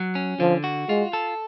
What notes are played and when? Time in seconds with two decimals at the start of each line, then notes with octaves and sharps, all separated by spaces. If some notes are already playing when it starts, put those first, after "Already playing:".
Already playing: F#3
0.15 C#4
0.40 D3 F3
0.64 F#4
0.88 G#3 F4
1.13 A4